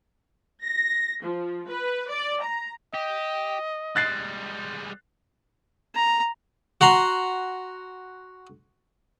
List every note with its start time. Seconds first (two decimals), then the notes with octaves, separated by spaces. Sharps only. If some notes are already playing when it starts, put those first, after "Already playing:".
0.62 A#6
1.23 F3
1.68 B4
2.08 D5
2.41 A#5
2.94 G4 D#5
3.96 G3 G#3 F#6 A6 C7
5.95 A#5
6.81 F#4 F#5 A#5 C6